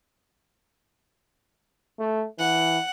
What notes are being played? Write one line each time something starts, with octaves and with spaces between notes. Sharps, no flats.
A3
E3 F#5